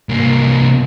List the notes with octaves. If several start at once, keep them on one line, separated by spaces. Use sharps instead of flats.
C2 A#3